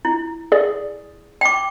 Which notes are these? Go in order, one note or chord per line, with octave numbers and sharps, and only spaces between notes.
E4
G#4 D5
G5 D6